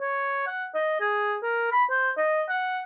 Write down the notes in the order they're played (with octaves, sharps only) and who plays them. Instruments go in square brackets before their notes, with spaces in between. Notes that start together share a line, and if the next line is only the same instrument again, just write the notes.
[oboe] C#5
F#5
D#5
G#4
A#4
B5
C5
D#5
F#5